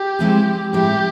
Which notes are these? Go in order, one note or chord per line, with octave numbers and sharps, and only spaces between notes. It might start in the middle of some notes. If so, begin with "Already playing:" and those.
Already playing: G4
F3 G#3 C4 E4 G#4
A2 F3 G#3 C4 E4 G4